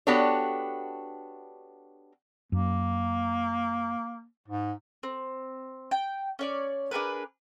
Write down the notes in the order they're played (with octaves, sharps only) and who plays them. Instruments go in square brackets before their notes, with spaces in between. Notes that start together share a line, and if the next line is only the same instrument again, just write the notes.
[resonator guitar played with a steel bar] B3 D4 F#4 G4 A4 C#5
[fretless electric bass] F#2 [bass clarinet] A#3
[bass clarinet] G#2
[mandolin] C4
G5
C#4 C#5 D5
D4 G#4 A#4 B4